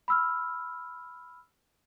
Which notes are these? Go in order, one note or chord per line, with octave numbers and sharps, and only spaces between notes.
B5 E6 F6